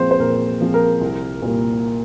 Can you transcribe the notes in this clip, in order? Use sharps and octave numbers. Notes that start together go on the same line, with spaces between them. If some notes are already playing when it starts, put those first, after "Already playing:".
Already playing: A#2 F3 G#3 C4 F4 C5
C5
A#2 A#4
F3 G#3 C4 F4
A#4
C2
A#2 G3 A#3